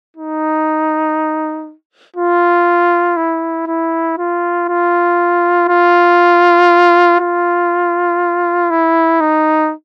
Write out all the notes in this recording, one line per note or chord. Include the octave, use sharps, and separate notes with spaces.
D#4
F4
E4
E4
F4
F4
F4
F4
E4
D#4